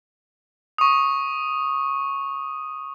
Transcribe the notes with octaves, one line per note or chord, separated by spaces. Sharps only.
C#6 D#6